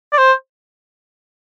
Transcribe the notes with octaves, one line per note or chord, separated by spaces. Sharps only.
D5
C5